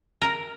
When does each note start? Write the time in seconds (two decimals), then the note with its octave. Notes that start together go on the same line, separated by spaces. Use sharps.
0.22 A#4